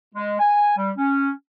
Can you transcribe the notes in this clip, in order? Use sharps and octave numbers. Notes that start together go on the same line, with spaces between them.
G#3
G#5
G3
C#4